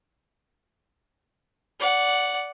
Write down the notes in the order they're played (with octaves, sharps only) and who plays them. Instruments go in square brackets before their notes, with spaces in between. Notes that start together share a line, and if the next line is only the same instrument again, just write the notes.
[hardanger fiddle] D5 F#5